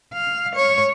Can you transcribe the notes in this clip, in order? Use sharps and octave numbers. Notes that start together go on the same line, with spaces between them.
F5
C#5